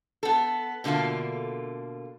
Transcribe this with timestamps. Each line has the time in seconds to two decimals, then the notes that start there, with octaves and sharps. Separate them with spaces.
0.23 B3 A4
0.84 B2 D3 A3 A#3 F4